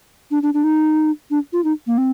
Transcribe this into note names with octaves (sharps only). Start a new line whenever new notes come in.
D4
D4
D4
D#4
D4
F4
D#4
A#3
C4